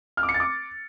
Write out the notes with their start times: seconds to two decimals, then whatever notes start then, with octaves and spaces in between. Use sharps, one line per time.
0.17 F6
0.23 D6
0.29 C#7
0.34 A6
0.40 D6